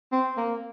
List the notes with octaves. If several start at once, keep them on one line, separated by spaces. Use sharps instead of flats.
C4
A#3